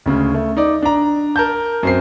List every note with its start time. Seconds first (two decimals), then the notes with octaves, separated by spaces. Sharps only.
0.06 D2 C#3 G#3
0.34 A3
0.57 D#4 D5
0.82 D4 A#5
1.36 A#4 A5 G6
1.83 F#2 C4 C7